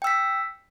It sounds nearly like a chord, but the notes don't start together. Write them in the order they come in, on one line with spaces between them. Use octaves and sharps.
G5 E6 B6